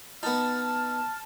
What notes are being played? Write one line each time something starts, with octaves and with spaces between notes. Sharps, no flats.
B3 D#4 A5 F6